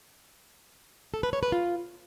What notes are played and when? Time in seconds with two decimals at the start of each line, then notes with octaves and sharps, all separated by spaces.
1.14 A4
1.23 B4
1.33 C#5
1.43 B4
1.52 F4